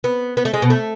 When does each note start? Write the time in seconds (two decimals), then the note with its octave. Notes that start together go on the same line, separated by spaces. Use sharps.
0.04 B3
0.37 B3
0.45 A3
0.54 G#3
0.62 B2
0.70 A3